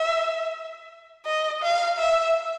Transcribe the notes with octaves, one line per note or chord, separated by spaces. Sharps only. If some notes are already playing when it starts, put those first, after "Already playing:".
Already playing: E5
D#5
F5
E5